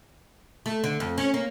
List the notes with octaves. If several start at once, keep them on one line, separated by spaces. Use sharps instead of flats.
A3
D3
F2
C#4
A#3